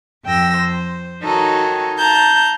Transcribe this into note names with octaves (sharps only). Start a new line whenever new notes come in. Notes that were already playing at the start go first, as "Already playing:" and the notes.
F2 G5 E6 A#6
C5
D#3 D#4 F#4 A4 C#5
F5 A5 A#5 G6